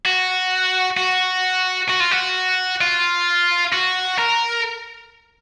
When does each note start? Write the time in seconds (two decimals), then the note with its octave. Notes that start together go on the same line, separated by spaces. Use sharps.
0.06 F#4
0.97 F#4
1.89 F#4
2.00 F4
2.11 F#4
2.81 F4
3.72 F#4
4.18 A#4